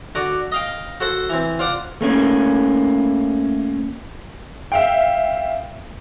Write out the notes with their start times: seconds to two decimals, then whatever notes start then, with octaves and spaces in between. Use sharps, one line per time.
0.15 D3 F#4 D5
0.52 D#5 F5 G5
1.00 F#4 A4 C5 F#5
1.30 E3 C4
1.59 F4 C5 D5 F#5
2.01 A3 A#3 C#4
4.72 E5 F5 G5